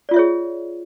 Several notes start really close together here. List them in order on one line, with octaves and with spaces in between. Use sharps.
D5 F4 E5 C#5 G#4